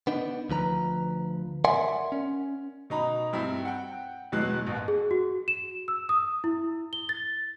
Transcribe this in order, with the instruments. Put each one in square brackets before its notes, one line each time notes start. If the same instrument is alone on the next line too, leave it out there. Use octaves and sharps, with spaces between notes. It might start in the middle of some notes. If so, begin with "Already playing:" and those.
[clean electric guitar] B3 D4 D#4
D2 F3 B4 A#5
A#4 D5 E5 F#5 G#5 C6
C#4
[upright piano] B2 D#4 A#5 B5
G2 C4 E4
F#5 G5
E2 B2 E3 F#3 G#3 F#6
A1 D#2
[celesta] G#4
F#4
E7
E6
D#6
E4
G7
A6